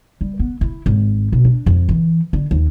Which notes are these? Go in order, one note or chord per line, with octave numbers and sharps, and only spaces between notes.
G3
B3
E4
G#1
B2
D4
F2
E3
D3
D#2